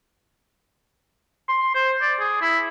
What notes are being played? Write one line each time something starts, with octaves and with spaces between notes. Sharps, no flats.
C6
C5
D5
G#4
E4